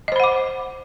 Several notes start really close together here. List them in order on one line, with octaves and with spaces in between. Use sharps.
D#5 C5 B5 F#5 D6